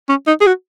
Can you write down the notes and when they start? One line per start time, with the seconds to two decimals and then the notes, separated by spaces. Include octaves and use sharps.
0.09 C#4
0.27 D#4
0.41 G#4
0.47 F#4